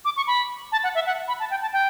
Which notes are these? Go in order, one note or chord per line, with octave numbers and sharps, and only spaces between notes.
D6
C#6
B5
A5
F#5
E5
F#5
B5
A5
G5
A5
G5